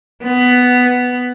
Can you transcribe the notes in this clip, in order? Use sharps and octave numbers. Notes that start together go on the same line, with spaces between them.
B3